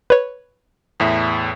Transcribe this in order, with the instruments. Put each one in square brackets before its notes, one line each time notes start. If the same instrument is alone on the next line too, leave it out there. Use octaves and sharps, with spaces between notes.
[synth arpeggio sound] B4 C#5
[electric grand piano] E2 A2 E5